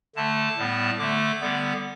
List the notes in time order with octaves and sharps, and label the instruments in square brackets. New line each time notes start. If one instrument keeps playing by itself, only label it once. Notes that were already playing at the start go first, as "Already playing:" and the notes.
[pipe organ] D3 A3 A5
A2 G3 B3
D3 A3 D6
D3 G3 B3